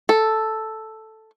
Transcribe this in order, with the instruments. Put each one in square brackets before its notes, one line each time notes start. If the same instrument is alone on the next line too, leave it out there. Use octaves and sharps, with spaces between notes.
[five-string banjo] A4